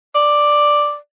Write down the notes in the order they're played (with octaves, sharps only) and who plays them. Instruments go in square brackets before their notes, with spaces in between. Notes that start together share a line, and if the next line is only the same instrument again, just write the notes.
[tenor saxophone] D5